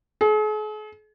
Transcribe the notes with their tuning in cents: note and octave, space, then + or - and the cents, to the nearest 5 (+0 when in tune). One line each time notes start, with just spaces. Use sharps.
G#4 +45